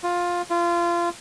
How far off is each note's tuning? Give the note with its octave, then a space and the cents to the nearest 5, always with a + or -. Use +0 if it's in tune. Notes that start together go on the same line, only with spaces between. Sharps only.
F4 +10
F4 -25